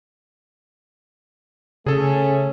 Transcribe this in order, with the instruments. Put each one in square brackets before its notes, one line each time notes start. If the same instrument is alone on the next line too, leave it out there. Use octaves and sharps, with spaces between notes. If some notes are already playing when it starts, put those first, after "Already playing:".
[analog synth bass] C#3 [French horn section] A3 C#4 [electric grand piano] G#4 A4